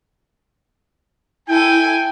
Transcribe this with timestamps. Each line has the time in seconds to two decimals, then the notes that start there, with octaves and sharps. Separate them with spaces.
1.48 E4 A4 G5 G#5